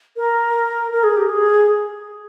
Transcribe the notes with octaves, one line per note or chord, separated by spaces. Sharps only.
A#4
A#4
G#4
G4
G#4